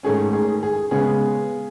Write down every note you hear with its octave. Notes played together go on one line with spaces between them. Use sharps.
G#2 D#3 A3 C#4 G#4
G#4
G#4
C#3 G#3 B3 G#4